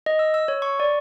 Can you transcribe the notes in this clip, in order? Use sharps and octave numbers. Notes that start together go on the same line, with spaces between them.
D#5
E6
E6
C#5
C#6
D5